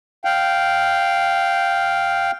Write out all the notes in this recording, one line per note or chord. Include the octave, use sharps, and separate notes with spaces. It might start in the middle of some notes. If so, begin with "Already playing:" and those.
F5 G5